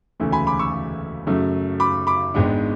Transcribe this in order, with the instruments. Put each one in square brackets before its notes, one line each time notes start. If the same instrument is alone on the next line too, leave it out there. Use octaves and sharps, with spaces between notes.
[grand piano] E1 D2 C#3 E3 A3
G#5 B5
B5 D6
C#6 E6
F#2 C#3 F#3 A3
B5 D6
B5 D6
G#1 G#2 G#3 B3 D4